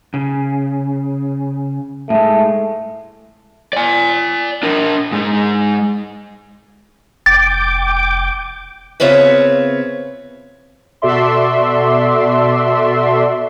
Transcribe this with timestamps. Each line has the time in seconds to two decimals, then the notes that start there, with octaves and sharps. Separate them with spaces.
0.14 C#3
2.10 A2 G#3 A3
3.73 D5 G#5
4.63 D4 A#4
5.12 G#2 G#3
7.26 F1 G5 D6 A6
9.00 C#3 B3 C4 F4 C#5 E5
11.02 B2 F#4 A4 D5 E5 C6